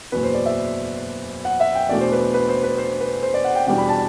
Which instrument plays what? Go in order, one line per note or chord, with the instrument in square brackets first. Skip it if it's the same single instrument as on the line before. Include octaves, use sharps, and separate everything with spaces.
[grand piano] F#1 E2 B2 B4
C5
D5
E5
F#5
E5
G5
E2 B2 A3 D4 D5
C5
B4
B4
C5
B4
C5
B4
C5
D5
F#5
G5
E2 B2 G3 D4 G5
B5
A5